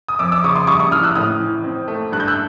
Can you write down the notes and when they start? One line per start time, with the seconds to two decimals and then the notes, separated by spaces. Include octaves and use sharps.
0.08 D#6
0.19 F2 D6 E6
0.32 D6 E6
0.44 C#3 C#6 D#6
0.55 C6 D6
0.67 G3 C#6 D#6
0.79 C#6 D#6
0.91 E3 D#6 F6
1.03 E6 F#6
1.15 A2 D#6 F6
1.40 E3
1.64 C4
1.88 A3
2.12 G2 F#6
2.20 G6
2.27 E6 F#6